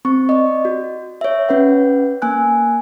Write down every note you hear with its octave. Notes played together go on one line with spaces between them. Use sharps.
C4 C#6
D5 D#5
F#4
C#5 E5
C#4 B4 F#5
A#3 G#5 F#6